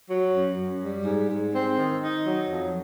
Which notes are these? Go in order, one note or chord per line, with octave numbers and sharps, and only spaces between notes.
F#3
F#2
F#2
G3
G#2
G#2
C4
D#3
D#4
F#3
F2